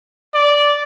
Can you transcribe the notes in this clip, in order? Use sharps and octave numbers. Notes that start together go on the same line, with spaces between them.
D5